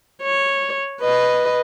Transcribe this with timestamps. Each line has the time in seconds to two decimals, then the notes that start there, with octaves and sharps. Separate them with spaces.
0.23 C#5
1.01 B4 D#5